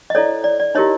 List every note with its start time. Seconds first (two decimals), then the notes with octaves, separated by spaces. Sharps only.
0.10 D#5
0.15 E4 A4 C#5 D5
0.44 D5
0.60 D5
0.75 D#4 E4 G4 A#4 C#5 D#5